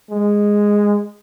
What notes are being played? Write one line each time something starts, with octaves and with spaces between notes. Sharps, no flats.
G#3